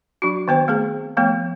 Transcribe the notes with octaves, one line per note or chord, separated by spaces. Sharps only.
F#3 D4 F#4
D#3 B3 C5
A3 B3 C4 G#4
F3 A3 B3